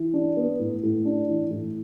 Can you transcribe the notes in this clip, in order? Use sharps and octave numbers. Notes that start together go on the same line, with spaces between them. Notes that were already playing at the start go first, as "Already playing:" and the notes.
Already playing: E3
D4
B3
A2
A2
D4
E3
A2